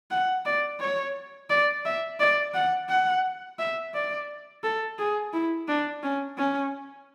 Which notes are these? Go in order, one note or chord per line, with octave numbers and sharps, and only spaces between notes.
F#5
D5
C#5
D5
E5
D5
F#5
F#5
E5
D5
A4
G#4
E4
D4
C#4
C#4